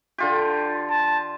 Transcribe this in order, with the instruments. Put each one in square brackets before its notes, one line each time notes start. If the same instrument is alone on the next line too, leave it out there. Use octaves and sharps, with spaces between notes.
[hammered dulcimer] D3 F4 G4
[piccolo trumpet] A5